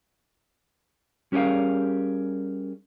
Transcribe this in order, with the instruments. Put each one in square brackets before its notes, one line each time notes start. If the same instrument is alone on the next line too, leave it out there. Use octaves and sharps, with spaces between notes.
[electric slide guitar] G3 C#4 G4 G#4 A#4 F5